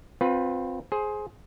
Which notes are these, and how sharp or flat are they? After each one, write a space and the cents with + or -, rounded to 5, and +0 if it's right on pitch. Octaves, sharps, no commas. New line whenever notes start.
C4 +0 F4 +30 B4 +0
G#4 +15 C5 +10